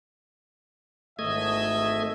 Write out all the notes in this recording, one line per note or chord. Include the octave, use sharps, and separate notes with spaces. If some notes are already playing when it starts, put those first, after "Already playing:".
G#1 E2 A3 D#5 E5 G#6